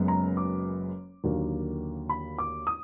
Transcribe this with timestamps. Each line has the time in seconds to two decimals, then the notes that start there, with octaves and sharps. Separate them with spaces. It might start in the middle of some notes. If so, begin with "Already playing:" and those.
Already playing: F#1 F#2 G#3 B3
0.08 A#5
0.37 D6
1.24 D#2 D3 F#3 A#3
2.09 B5
2.38 D6
2.67 D#6